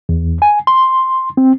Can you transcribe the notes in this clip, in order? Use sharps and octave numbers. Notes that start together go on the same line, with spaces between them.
E2
G#5
C6
C4